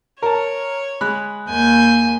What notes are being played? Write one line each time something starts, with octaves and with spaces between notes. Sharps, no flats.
A#4 C#5 A5
G#3 B5 F#6
D#2 G#5 G6